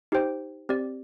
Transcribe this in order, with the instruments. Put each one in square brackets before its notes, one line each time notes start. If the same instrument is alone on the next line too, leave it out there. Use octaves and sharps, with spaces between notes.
[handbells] D#4 G4 C5 G5
C4 G4 D5